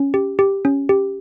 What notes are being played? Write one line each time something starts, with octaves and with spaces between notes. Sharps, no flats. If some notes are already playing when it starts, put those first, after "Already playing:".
Already playing: C#4
G4
G4
C#4
G4